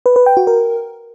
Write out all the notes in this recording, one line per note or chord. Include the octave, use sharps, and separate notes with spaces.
B4
B4
G5
F#4
A#4